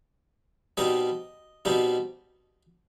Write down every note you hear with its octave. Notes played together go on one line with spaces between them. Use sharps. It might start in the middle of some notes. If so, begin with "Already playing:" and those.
B2 G3 C4 D#4 D#5
B2 G3 C4 D#4